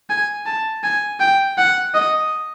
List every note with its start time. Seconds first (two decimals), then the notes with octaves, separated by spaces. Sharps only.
0.10 G#5
0.46 A5
0.83 G#5
1.20 G5
1.58 F#5
1.94 D#5